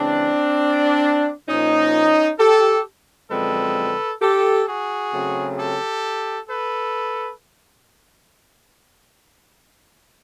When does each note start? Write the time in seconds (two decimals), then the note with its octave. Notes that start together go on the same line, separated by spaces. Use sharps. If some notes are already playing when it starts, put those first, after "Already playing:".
Already playing: C#3 E3 G#3 C4 D4
1.49 A#2 F3 A#3 C#4 D#4
2.39 G4 A4
3.31 F#2 D3 F3 G#3 C4 A4 B4
4.21 G4 A4
4.67 F#4 G#4
5.13 C#3 F#3 A3 C4
5.57 G4 A4
6.49 A4 B4